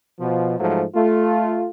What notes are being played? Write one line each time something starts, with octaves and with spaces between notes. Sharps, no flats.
B2 F3
G#2 F3 F#3 A3
A3 F4